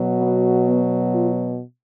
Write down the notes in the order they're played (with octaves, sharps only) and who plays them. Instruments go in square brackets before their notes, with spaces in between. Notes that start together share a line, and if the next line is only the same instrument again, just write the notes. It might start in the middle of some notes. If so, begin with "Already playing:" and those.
Already playing: [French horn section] B2 F#3
B3
B3
F4